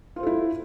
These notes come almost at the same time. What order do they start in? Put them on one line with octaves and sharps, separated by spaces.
F4 C5 A4 E4